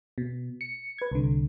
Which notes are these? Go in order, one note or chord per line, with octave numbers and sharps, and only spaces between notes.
B2
C#7
B4 G#6
C2 D3